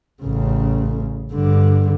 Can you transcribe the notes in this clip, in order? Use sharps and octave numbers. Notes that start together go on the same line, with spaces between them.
A1 C#3
G2 D3